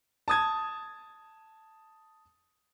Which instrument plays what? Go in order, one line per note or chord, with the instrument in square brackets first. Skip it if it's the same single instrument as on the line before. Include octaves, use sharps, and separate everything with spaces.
[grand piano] A5 D#6 G#6